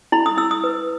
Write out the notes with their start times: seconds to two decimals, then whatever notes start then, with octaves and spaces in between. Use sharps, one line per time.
0.12 E4 B5
0.26 D#6
0.37 E4 E6
0.51 D#6
0.64 B4